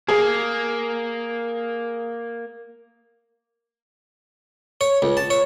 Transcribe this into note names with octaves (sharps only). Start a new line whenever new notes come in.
A#3 G#4
C#5
C#2
A5
C#5